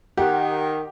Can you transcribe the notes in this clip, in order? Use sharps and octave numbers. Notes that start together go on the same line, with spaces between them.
D#3 G4 F#5